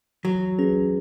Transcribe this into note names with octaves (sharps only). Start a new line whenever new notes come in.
E3 F#3
C#4 G#4 B4